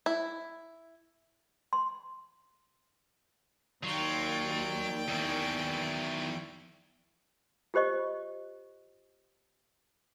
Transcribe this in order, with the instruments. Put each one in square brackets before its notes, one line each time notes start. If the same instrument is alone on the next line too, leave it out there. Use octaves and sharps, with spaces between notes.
[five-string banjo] E4
[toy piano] C6
[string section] D#2 [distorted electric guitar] F#3 [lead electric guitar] F4 [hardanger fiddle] D5 G5
[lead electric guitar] E2 [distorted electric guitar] D#3 F#3
[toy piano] F4 G4 C5 D#5 C#6